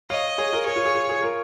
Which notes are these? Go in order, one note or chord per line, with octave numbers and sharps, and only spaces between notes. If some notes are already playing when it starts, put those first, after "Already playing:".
C#5 D#5 F5
G#4 C#5
F4 A#4
G#4 C#5
F4
G#4
F4
G#4
F4 A#4